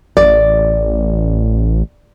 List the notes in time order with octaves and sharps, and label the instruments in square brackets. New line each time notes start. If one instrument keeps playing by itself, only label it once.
[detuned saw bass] A1 [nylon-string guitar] D5